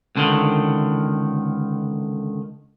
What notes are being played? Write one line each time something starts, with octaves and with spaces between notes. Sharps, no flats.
C#2 D3 D#3